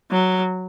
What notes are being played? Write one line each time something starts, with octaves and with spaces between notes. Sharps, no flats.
F#3